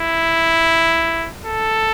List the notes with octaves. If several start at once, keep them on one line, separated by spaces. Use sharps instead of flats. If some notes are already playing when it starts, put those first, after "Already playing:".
Already playing: E4
A4